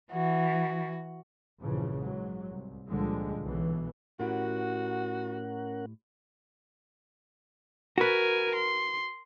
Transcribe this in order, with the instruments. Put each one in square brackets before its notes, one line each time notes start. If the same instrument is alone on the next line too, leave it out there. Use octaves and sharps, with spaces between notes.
[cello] E3 [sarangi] F#4
[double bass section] A#1 G2 C#3 E3 F3
G#2 F#3
C2
C#2 A#2 D3 F3 G3 G#3
B1 B2 E3
[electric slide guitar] A2 E4 G4 [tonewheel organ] C#4 A#4 F#5 [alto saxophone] F#4
[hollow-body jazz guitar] F#4 B4 [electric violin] A#4 G#5
[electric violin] C6